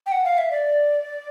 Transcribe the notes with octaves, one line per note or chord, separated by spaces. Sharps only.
G5
F#5
F5
E5
D5